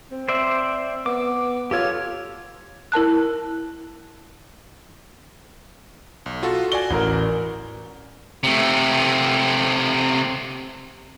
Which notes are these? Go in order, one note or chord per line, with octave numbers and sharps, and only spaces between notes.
C4
C5 D5 E5
B3 D6
F4 G4 A4 C#5
E4 A#4 A5 F#6
B1
F4 F#4 A4
F#4 D5 G#5 G7
A1 A#4
C3 A3